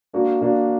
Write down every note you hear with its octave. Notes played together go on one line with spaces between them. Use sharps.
A#3 D4 F#4
A#3 D4 F#4